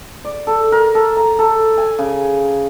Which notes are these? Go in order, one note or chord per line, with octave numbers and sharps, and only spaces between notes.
D5
A4
A#4
A4
A#5
A4
G#5
C#3